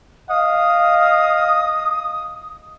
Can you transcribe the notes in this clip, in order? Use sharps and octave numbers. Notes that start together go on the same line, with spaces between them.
D#5 F5 D#6